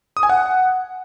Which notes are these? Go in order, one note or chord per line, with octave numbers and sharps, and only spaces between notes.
D#6
G#5
F#5